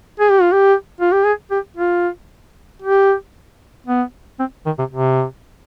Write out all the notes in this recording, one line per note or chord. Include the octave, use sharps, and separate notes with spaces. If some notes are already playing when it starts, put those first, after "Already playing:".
G#4
G4
F4
G4
F4
G4
G#4
G4
F4
G4
B3
C4
D#3
C3
C3